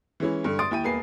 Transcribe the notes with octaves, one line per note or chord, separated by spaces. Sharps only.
E3 G#3 C#4 E4
G2 D3
C6 D#6 A6 D7
D#2 E4 G5 D#7
E1 A#3 B4 G#5 C7